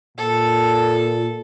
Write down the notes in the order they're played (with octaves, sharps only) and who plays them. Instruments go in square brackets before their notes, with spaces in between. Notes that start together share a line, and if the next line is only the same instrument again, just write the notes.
[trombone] A#2 [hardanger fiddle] A4